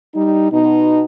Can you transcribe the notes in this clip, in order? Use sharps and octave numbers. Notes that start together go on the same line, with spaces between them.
G3 D#4
B2 D#4